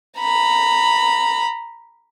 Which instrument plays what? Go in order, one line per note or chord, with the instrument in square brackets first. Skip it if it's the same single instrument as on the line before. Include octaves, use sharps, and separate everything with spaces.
[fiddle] A#5 B5